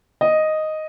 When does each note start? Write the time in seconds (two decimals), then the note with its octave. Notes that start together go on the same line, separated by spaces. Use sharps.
0.21 D#5